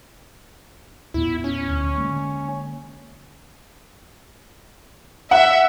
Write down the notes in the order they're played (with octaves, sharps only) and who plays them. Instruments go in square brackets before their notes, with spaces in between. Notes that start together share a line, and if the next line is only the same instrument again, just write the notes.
[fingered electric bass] E2 A#2 B3 [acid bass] E4
[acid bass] C#4
[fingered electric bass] D2
D3 G#3 A#3
[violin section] E5 [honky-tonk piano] F#5